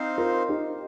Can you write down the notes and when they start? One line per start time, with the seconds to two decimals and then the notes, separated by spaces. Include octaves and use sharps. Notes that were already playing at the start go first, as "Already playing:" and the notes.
Already playing: C4 D#4 C5 F5
0.18 F4 A#4
0.49 D#4 G4